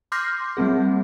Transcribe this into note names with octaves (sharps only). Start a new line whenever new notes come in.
C6 D6 F6 G6 A#6 C7
G3 A#3 C4 G#4